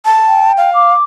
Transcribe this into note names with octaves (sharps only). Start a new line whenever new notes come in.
A5
G5
F5
D6